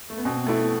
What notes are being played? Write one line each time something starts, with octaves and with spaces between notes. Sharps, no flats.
A3
B3
B2 C4
A3 B3 E4